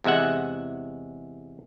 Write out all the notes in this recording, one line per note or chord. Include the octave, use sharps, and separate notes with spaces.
E2 C3 G#3 E5 F#5